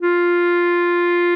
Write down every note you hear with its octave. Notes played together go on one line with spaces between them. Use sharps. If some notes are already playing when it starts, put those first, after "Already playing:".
F4